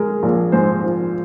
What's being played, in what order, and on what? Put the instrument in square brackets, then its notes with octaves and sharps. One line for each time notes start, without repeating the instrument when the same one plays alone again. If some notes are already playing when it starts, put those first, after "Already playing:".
Already playing: [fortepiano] G#3 [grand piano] G#4 A#4
[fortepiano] A#1
[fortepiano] G#2 [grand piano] C5
[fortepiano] F3